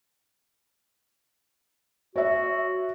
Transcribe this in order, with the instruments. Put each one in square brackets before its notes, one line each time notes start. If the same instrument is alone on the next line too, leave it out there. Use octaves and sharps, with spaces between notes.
[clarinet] F#4 [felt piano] C#5 E5